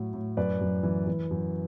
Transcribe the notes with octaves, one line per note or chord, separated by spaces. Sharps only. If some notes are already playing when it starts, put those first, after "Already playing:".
Already playing: A2 F#3
A2
F#2 B4 D5
F#2
E3
E3
F#2